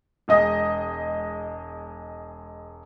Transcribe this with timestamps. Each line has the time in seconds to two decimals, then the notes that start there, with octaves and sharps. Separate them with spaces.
0.28 E1 G#3 D#5 D#6